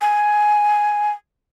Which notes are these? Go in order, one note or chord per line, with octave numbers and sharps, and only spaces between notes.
G#5